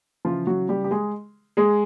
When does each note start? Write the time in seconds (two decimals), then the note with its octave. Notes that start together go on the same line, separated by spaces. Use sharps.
0.25 C#3 E3 F3 F4
0.47 F#3 F#4
0.69 G3 G4
0.84 G4
0.91 G#3 G#4
1.57 G#3 G#4